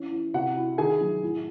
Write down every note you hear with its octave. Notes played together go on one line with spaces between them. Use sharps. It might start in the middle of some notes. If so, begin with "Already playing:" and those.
Already playing: E3 C#4
E3
C3 F#4 F#5
E4
D#3 G#4 G#5
F#3
A2